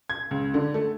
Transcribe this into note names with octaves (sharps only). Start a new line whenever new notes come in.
G#6
C#2
D3
A3